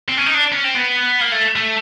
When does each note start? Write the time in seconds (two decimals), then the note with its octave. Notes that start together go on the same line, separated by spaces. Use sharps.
0.09 C4
0.17 C#4
0.26 D#4
0.34 D4
0.52 C#4
0.64 C4
0.75 B3
1.21 A#3
1.32 A3
1.56 A3